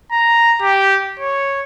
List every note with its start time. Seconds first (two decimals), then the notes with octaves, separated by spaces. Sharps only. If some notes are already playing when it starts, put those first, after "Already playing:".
0.12 A#5
0.62 G4
1.20 C#5